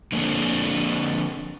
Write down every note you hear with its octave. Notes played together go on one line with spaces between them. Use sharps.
D3 F3 A#3 C4 D4